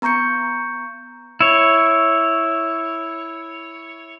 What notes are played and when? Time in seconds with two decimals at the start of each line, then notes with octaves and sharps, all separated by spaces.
0.02 B3 A#5 C#6 G6 C#7
1.41 E4 C#5